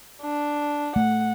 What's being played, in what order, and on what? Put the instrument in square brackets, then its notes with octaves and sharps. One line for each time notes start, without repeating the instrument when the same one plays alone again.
[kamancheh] D4
[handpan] A3 [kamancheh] F#5